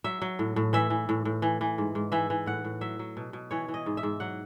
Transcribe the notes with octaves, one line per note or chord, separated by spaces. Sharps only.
F#3 E5
F#3
A2
A2
E3 E5
E3
A2
A2
E3
E3
G#2
G#2
E3 E5
E3
A2 F#5
A2
F#3 E5
F#3
B2
B2
E3 C#5
E3
D#5
G#2
E5
G#2
F#3 F#5